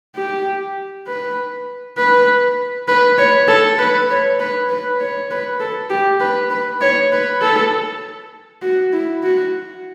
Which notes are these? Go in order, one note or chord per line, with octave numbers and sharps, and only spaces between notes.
G4
B4
B4
B4
C#5
A4
B4
C#5
B4
B4
C#5
B4
A4
G4
B4
B4
C#5
B4
A4
F#4
E4
F#4